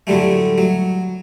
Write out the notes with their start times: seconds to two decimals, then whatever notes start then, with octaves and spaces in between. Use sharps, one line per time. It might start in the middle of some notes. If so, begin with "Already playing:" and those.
0.07 A2 D3 F#3 G3 A3
0.58 F#3